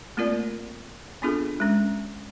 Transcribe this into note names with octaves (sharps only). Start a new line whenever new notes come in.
A3 A#3 C4 F4 A#4 D5
B3 C4 D4 F4 G#4 A4
G#3 C#4